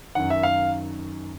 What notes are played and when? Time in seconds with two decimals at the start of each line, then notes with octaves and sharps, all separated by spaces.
0.15 F#2 D#3 F#5
0.30 E5
0.43 F5